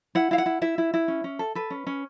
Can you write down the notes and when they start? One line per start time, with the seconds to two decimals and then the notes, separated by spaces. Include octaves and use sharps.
0.15 E4 F#5
0.31 E4 F5
0.38 F#5
0.46 E4
0.62 E4 E5
0.78 E4
0.94 E4
1.08 C#4
1.24 C#4
1.39 A4
1.55 A4 B4
1.70 C#4
1.87 C#4